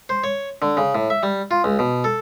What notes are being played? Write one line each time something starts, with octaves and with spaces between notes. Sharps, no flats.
C5
C#5
D3
C#3
A2
E5
G3
F4
C#2
B2
A4